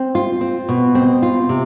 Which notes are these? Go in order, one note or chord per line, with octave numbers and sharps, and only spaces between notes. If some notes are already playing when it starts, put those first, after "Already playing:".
Already playing: C4
F4
C4
B2
C4
F4
C3